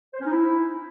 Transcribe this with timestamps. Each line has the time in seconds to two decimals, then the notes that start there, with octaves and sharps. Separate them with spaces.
0.14 C5
0.20 C#4
0.26 D#4
0.31 E4